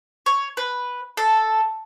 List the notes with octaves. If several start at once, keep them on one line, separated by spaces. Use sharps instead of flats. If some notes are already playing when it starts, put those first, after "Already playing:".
C#5
B4
A4